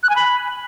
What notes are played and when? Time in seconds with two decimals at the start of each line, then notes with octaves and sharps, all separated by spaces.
0.03 F#6
0.10 G#5
0.16 B5